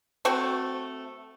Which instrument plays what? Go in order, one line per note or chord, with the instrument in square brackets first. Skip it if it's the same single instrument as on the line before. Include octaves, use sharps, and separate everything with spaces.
[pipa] A3 C4 F#4 A4